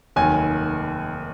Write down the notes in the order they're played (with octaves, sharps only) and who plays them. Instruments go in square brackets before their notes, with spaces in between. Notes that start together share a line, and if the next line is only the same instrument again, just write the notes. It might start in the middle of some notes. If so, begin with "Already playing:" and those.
[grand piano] F1 D#2 D#3 F#3 G#5